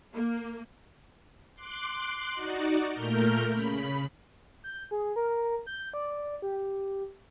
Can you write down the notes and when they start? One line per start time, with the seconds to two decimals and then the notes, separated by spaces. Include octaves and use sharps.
0.15 A#3
1.55 C6 D6 F#6
2.33 D#4 F#4 D5
2.91 A#2 A3 A#4 F6 G6
3.50 C#3 B5
4.64 G6
4.91 G#4
5.16 A#4
5.66 G6
5.94 D5
6.42 G4